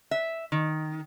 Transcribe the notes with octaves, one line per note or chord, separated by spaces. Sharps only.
E5
D#3